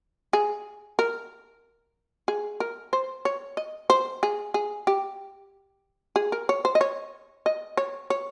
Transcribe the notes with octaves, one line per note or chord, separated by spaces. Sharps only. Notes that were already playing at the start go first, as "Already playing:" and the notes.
G#4
A#4
G#4
A#4
C5
C#5
D#5
C5
G#4
G#4
G4
G#4
A#4
C#5
C5
D#5
C#5
D#5
C#5
C#5